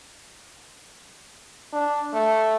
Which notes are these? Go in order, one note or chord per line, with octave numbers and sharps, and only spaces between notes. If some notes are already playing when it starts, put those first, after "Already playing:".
D4
A3